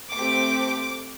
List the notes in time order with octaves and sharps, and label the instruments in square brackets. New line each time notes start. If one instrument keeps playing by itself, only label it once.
[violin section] A3 C4 G4 D6